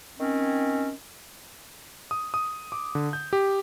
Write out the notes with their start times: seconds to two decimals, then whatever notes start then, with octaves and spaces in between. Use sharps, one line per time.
0.19 D#3 C4 C#4
2.11 D#6
2.34 D#6
2.72 D6
2.95 D3
3.13 G6
3.33 G4